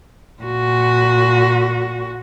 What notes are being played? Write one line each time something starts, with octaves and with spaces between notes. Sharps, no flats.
A#2 F#4